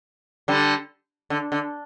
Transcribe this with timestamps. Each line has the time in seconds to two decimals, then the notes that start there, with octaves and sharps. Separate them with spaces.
0.48 D3 G3
1.30 D3
1.52 D3